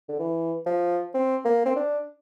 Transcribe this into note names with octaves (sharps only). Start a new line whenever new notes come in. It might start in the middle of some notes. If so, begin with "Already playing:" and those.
D3
E3
F3
C4
A#3
C4
D4